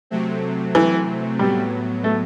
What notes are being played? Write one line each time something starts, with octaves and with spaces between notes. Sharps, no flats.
C3 F#3 A3 C4
E3
A2 F#3 G3 B3
A3